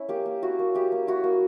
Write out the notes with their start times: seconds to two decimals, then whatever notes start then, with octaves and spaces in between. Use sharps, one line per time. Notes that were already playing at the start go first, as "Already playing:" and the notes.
Already playing: C#4 E4
0.08 A#3 G4
0.26 A#3
0.42 E4 F#4
0.59 A#3
0.74 E4 G4
0.92 A#3
1.07 E4 F#4
1.24 A#3